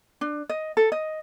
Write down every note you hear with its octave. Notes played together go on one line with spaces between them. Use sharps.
D4
D#5
A4
D#5